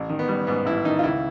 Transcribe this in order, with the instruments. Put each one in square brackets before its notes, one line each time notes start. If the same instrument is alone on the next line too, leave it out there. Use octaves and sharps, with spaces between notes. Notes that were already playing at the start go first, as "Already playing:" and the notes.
Already playing: [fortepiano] A1
D#3
B3
G3
G#2 B3
A1 E4
D#3 D#4
F4
C#2 E4